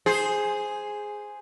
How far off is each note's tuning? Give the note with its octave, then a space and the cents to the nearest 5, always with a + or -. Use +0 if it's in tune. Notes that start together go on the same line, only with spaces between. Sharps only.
G#4 +0 C5 +0